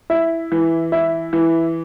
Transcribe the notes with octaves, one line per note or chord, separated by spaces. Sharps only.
E4
E3
E4
E3